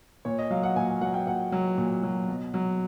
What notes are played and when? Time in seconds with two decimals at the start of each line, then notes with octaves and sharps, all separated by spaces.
0.25 A#2 C#5
0.38 D#5
0.51 F#3 F5
0.63 F#5
0.76 A#2 G#5
1.01 F#3 F#5
1.14 G5
1.26 A#2 F#5
1.52 F#3
1.78 A#2
2.03 F#3
2.28 B2
2.54 F#3